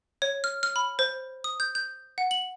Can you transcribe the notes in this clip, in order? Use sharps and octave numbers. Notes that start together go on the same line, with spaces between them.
C#5
F6
F6
B5
C5
D#6
G6
G6
F#5
F#7